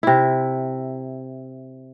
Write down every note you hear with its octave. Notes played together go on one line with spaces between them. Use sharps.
C3 E4